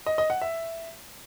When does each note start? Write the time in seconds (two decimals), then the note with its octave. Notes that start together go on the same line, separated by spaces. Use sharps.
0.06 D#5
0.18 D#5
0.30 F#5
0.42 E5